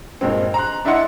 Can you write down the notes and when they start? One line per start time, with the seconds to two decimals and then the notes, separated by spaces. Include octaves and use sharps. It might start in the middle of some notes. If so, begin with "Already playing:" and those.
0.21 G2 A#2 G#3 C4
0.54 A#5 C6 F#6
0.85 D4 E4 D5 D#5 F#5 C6